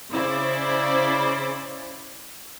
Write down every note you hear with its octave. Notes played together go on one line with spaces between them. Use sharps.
C#3 E4 C5 D5